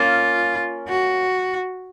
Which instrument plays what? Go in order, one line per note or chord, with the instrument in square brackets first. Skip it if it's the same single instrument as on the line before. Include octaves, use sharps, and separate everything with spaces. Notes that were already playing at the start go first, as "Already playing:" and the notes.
Already playing: [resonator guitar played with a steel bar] A#3 C#4 [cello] F4
[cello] F#4